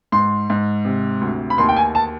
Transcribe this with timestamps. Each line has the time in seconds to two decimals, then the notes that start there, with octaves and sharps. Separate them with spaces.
0.12 G#2 C6
0.50 G#2
0.85 C3
1.21 D2
1.50 B5
1.58 D#2 C6
1.69 G5
1.77 G#5
1.95 A5